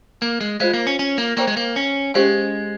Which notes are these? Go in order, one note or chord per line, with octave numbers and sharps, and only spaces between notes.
A#3
G#3
G#3 F4 C5 F5
A#3
C#4
C#4
A#3
A#3 C5 G5 A#5 C#6
G#3
A#3
C#4
G#3 C#4 G4 C5 F5 G#5